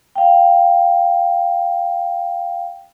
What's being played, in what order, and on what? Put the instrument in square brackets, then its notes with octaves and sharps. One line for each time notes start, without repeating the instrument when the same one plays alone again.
[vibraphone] F5 G5